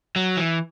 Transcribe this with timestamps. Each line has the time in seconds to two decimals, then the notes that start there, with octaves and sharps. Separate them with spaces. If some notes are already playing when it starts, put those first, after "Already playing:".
0.16 F#3
0.37 E3